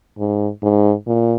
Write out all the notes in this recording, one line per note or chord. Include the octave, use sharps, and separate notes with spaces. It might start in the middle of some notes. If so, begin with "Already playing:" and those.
G#2
G#2
A#2